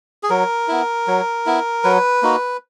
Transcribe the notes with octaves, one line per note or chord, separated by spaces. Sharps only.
G#4
F#3 A#4
B3 E4
F#3
B3 E4
F#3 B4
A#3 D#4 F#4